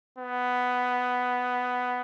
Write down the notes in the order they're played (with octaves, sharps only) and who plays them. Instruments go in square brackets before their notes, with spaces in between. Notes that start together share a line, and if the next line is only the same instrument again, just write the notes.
[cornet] B3